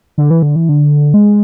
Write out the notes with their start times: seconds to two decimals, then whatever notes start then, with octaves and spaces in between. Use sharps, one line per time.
0.18 D3
0.30 E3
0.42 D3
0.56 E3
0.69 D3
1.14 G#3